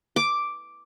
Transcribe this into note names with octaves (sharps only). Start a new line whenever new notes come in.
D6